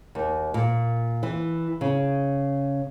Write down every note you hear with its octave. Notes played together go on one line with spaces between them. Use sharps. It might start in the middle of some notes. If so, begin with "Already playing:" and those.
D#2
A#2
E3
C#3